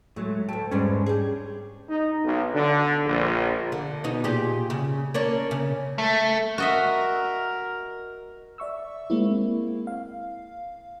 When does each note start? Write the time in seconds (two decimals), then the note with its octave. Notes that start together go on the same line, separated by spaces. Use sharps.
0.16 A2 F#3 G#3 A3
0.49 D2 A3 G5 A5
0.71 E2 G#2 G3 C#4 D4
1.06 G4 G#4
1.90 D#4
2.24 B1
2.55 D3
3.06 A#1
3.72 D3
4.04 B2 D#4
4.24 A#2 G4 G#4
4.70 C#3
5.14 A#3 C#4 D4
5.51 C#3
5.98 A3
6.58 F#4 A#4 D#5 E5
8.58 D5 E5 C#6 E6
9.10 G#3 A#3 C4 E4
9.87 F5